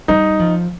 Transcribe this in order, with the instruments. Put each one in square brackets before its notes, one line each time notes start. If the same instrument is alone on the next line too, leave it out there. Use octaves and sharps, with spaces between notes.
[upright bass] G3 [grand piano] D#4
[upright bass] F3